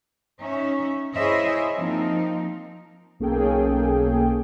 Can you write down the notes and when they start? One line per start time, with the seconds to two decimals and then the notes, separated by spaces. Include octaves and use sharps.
0.40 C#4 D#4 E5
1.14 E4 G#4 C5 C#5 D#5 E5
1.75 F3 A#3 C4 D#4
3.20 B1 A#3 C#4 G#4 A4 G5